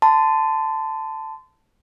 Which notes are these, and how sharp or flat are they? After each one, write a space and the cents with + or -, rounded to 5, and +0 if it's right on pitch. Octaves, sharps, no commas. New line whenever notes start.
A5 +0 C6 -30